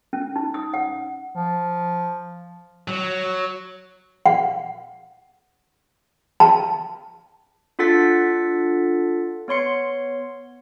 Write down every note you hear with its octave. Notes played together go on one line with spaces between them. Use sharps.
C#4
D#4
D#6
F#5
F3
F#3
F#5
A5
D4 F4 A4 F#5 A6 B6
B3 C#5 C6 C#7